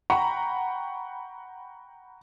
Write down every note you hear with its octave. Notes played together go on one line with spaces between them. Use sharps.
F#5 G5 A#5 B5 C#6